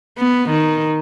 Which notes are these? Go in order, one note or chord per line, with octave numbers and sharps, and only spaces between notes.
B3
D#3